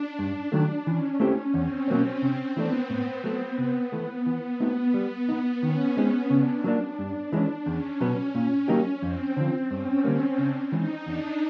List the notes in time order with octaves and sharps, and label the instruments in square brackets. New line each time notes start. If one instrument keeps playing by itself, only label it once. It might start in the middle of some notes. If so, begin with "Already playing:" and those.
Already playing: [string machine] D4
[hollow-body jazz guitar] G2
D#3 F#3 A3
[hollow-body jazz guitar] E3 [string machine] C#4
[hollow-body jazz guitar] A3 C4 E4 G4
[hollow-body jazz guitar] E2 [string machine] C4
[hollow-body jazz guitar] B2 F#3 A#3 C#4
[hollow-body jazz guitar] C3 [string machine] C4
[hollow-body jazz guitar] E3 A3 D4 [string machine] B3
[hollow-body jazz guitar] A2 [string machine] B3
[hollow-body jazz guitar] F#3 A3
[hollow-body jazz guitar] C3 [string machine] B3
[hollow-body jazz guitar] E3 A3
E3
A3 C4 D#4 F#4
[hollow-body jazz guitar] G3 [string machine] B3
[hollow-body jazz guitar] B3 D#4
[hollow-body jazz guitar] D#3 [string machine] C#4
[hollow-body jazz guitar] G#3 C4 D#4 G#4
[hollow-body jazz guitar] C#3 [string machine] D4
[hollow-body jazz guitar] F#3 A#3 D4
G2
E3 G#3 C#4
[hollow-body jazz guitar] E2 [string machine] C#4
[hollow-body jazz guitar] B2 F#3 B3
[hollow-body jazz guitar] A#2 [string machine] C#4
[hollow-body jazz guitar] F#3 A#3 D#4 G4
[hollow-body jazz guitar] F2 [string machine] C4
[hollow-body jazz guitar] D3 F3 [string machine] C4
[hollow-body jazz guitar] G2 [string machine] C#4
[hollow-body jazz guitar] D3 G3 A#3
[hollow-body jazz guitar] C#3 [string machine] D4
[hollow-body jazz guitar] E3 G#3 [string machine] D#4
[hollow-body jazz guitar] E2 [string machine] D4